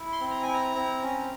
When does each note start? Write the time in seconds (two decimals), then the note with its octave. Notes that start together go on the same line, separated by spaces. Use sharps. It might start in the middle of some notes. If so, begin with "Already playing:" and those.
Already playing: E4
0.12 C6
0.21 C4
0.30 A#5
0.42 G#5
0.47 E4
0.53 A#5
0.76 C4
1.02 C#4